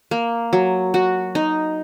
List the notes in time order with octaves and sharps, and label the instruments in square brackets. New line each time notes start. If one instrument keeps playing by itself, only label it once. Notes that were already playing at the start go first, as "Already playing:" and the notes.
[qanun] A#3
F#3
F#4
D#4